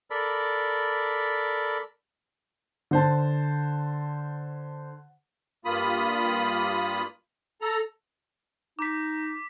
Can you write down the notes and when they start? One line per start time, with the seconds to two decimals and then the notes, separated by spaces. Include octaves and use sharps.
0.10 A4 A#4 D5 B5
2.91 D3 C5 A5
5.65 G2 A#3 F4 B5 D#6
7.61 A4 A#5
8.79 D#4 D6 B6